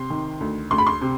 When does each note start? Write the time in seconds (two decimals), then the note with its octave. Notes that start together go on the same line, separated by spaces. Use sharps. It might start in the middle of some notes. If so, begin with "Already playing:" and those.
Already playing: C3 C6
0.10 D#3
0.40 D2
0.71 D2 C6
0.78 B5
0.87 C6
1.01 C3